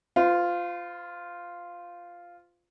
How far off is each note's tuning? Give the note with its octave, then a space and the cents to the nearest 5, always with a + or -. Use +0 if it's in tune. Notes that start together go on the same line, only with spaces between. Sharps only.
F4 +0 C5 -35